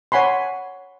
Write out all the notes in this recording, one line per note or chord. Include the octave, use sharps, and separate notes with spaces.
C#5 F#5 G#5 B5 C6